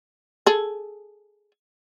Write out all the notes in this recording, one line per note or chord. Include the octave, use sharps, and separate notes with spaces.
G#4 A4